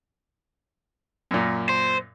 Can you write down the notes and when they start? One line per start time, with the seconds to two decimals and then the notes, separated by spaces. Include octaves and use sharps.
1.31 F#2 A#2
1.69 C5